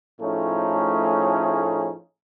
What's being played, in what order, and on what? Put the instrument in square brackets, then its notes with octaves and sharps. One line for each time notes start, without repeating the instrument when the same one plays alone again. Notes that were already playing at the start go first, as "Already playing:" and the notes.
[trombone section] A2 F3 A3 C#4 D#4 G#4